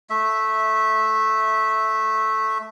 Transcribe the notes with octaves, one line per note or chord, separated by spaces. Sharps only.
A3 E5